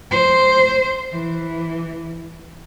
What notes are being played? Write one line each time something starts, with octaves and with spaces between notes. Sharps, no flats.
C5
E3